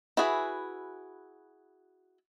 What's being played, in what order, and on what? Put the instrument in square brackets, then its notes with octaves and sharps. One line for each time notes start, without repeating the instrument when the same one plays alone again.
[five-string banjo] E4 F#4 G#4 B4